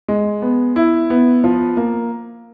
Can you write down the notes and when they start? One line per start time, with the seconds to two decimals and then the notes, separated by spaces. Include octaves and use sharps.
0.08 G#3
0.42 B3
0.76 E4
1.10 B3
1.44 F3
1.77 A#3